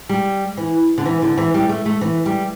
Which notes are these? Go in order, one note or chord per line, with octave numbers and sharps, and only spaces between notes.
G3
E3
D3
E3
D3
E3
G3
A3
A3
E3
G3